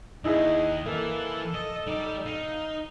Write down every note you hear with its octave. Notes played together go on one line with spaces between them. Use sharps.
D#2 D#4 E4 G#4 D#5
E3 A#3 A4
D#5
G3 D#4 D5
D#4 F5